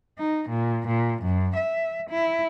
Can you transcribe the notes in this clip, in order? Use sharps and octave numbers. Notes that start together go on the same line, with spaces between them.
D#4
A#2
A#2
F#2
E5
E4